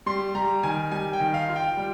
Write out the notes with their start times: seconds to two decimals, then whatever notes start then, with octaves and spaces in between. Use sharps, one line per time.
0.06 G3 C6
0.35 G3 A#5
0.63 D#3 G#5
0.92 G3 G#5
1.13 G5
1.20 D#3
1.34 F5
1.48 F4
1.56 G5
1.77 G3